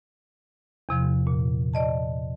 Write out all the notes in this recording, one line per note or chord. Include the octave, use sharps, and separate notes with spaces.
E2 C3 F3
A#2
D5 D#5 A5